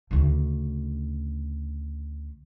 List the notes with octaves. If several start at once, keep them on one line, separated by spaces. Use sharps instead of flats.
D2 C#3